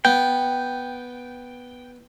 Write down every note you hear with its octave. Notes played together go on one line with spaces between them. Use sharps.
B3 G5